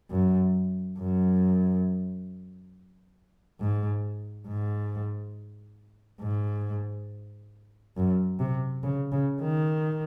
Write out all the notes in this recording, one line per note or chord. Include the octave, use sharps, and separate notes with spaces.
F#2
F#2
G#2
G#2
G#2
F#2
C3
C#3
C#3
D#3